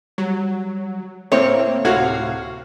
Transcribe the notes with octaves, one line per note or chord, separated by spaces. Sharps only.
F#3 G3
A2 A#3 C4 C5 C#5 E5
D2 A2 C3 F#4 F5 G#6